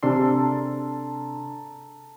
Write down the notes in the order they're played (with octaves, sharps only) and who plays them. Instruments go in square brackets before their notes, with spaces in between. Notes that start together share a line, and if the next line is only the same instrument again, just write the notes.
[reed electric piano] C3 D4 C6 [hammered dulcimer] A4 A#4